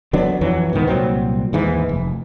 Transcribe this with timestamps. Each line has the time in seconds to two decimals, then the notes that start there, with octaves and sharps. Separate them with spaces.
0.13 D3 F#3 B3 D4
0.41 F2 E3 F#3
0.73 C#2 G#2 D#3 B3
0.87 C2 A#2 F#3 C4
1.53 D#2 G#2 E3
1.89 F1